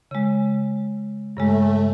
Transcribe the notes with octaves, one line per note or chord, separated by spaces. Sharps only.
C#3 G#3
G2 C#3 G#3 A3